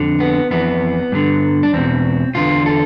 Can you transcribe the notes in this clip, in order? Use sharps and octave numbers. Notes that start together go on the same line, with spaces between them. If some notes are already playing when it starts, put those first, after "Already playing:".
Already playing: F2 D3
B3
F2 E3 B3
G2 D3
D4
E2 B2 C4
E2 D3 F4
A4